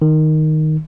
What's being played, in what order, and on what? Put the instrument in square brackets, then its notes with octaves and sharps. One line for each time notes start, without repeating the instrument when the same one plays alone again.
[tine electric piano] D#3